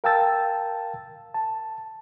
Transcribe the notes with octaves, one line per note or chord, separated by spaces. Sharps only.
A#4 F5 G5 A5 E6 A6
A5